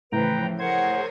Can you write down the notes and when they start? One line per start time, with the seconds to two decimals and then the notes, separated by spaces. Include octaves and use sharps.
0.12 A2 C#3 E3 F3 B4 G5 A#5
0.59 G#4 A#4 C5 C#5 F#5 G#6